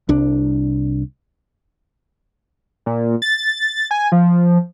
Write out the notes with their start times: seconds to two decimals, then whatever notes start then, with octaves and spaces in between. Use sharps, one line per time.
0.09 C2 D4
2.86 A#2
3.22 A6
3.91 G#5
4.12 F3